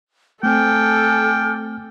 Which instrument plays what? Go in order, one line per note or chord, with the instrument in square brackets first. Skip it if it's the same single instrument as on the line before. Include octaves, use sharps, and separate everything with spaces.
[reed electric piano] A3 C4 [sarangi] A4 [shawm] G5 [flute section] G#5 D6 F6